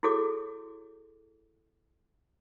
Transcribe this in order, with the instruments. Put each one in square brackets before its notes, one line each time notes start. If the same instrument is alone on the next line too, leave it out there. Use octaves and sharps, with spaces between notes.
[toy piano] E4 F#4 G#4 A4 C#5 D6